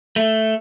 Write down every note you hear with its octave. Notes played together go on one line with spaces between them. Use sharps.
A3